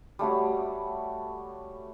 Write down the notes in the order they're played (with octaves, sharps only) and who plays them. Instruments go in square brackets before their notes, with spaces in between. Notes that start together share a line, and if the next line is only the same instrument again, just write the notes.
[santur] G3 A3 C#4 F#4